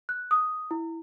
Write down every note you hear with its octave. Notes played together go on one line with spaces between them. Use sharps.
F#6
D#6
E4